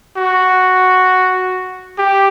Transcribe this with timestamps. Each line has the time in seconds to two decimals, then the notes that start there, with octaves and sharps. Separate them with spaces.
0.17 F#4
1.98 G4